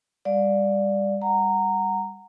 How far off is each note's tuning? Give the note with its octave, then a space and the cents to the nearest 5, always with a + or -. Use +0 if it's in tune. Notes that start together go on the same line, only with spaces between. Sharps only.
G3 +30 D5 +0 F5 +45
G3 +20 F#5 +0 A#5 -15